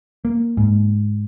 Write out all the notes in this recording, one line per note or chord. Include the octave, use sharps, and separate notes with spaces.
A#3
G#2